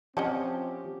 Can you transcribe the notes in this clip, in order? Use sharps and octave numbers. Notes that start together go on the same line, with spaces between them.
F3 C4 C#4 G4 D#5 F#5 G5 A5